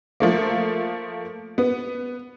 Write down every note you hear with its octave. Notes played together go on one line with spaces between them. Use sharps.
F3 A3 A#3
B3